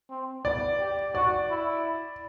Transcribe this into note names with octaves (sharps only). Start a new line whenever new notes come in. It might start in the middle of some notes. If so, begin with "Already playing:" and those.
C4
B3 D5
G4
F#4 D5
E4